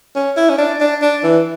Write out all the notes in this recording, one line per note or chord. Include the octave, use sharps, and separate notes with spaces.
C#4
E4
C#4
D4
D4
D4
E3